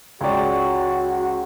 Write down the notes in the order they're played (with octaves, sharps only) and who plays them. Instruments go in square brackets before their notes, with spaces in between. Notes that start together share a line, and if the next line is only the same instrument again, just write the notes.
[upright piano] C#2 D5 [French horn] F#4 [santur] C#5 G5 C6